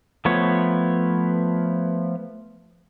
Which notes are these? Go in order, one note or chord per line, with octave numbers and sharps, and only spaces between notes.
F3 A3 B3 C#5